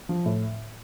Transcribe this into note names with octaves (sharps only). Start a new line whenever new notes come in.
F3
A2